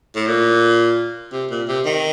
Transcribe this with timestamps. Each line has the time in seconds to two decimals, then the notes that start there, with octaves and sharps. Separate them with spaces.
0.15 A2
0.27 A#2
1.33 C3
1.50 A#2
1.68 C3
1.85 D#3